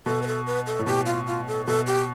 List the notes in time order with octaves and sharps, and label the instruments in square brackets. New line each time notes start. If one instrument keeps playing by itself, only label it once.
[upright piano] B2 [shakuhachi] A4
[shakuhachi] B4
A4
B4
A4
[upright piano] A2
[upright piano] B2 [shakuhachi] G4
[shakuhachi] F4
F4
A4
[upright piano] B2 [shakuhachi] A4
[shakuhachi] G4